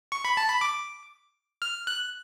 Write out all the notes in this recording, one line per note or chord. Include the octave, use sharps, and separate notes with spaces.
C#6
B5
A5
B5
D6
F6
F#6